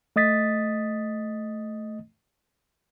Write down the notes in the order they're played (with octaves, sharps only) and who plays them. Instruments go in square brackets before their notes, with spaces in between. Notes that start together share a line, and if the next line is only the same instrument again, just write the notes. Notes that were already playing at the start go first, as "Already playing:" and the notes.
[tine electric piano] A3 D#5 D#6 A6 B6